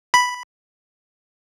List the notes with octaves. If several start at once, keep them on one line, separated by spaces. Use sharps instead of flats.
B5